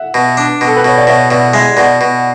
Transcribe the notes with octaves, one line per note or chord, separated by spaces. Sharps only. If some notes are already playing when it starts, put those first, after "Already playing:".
Already playing: E5 F#5
B2
D4
B2
A4
B4
B2 C#5
D5
B2 C#5 E5
B2 D5 F#5
G#3 E5 G#5
B2 D5 F#5
B2